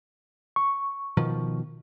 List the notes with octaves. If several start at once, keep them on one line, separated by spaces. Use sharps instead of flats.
C#6
B2 D#3 F3